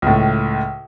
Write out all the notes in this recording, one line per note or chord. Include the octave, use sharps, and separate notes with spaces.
C#2 A2